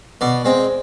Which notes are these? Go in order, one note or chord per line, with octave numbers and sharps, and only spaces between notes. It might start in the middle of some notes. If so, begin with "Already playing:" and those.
B2 D5
G#3 C4